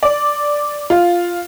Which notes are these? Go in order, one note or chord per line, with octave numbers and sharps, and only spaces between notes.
D5
F4